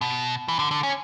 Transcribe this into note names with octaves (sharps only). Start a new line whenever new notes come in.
B2
E3
D3
D3
C#4